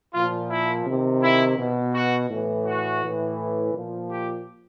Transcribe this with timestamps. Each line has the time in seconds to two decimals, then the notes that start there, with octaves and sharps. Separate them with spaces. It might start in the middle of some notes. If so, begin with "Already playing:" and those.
0.14 A#2 F3 F4
0.50 E4
0.86 C3 D#3
1.23 E4
1.58 B2
1.94 F#4
2.30 A2 E3
2.66 F#4
3.02 A2 E3
3.74 A#2 F3
4.10 G4